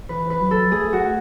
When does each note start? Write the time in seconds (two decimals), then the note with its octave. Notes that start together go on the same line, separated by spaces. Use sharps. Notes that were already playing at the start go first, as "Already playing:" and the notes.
0.09 E3 B4
0.30 B4
0.41 F#3
0.51 A4
0.72 A3 G#4
0.93 F#4